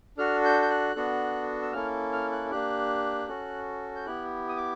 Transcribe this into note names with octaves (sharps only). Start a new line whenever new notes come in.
D4 F#4 A4 F6
G6
G6
F#6
B3 D4 F#4 A4
E6
A#3 C#4 E4 A4 F6
F6
F#6
A#3 D4 G4 F#6
C#4 F#4 A4
G6
B3 E4 G4 F#6
D#6
D6